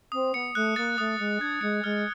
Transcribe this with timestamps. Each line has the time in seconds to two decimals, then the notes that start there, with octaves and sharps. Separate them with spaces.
0.12 C4 D#6
0.34 B3 C#7
0.55 A3 F#6
0.76 A#3 A6
0.98 A3 D#6
1.19 G#3 C#7
1.40 D4 G#6
1.61 G#3 C#7
1.84 G#3 F6